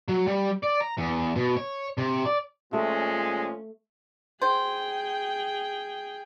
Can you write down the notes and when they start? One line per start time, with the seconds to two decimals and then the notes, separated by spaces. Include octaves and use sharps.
0.08 F#3
0.27 G3
0.63 D5
0.80 A#5
0.97 E2
1.36 B2
1.57 C#5
1.97 C3
2.25 D5
2.73 A#2 F3 G#3 A3 C#4
4.42 G#4 C5 G5